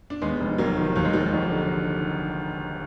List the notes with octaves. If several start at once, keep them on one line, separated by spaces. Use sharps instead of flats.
D4
D#2 G#3 B3
F1
F1 F#3 A#3
D#3
D#2 F#3
G#3
F1 D#3 F#3
F1 D#3 F#3
D3